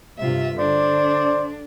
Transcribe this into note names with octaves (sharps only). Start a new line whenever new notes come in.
G2 C3 F4 E5
D3 D4 C5 D5